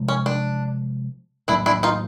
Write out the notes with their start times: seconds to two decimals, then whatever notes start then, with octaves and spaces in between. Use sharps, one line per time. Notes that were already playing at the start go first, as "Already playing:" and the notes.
Already playing: C3 F3 G#3
0.08 C#4
0.26 D4
1.48 A2 F#3 A#3 D4 E4
1.66 D4 E4
1.83 D#4 F4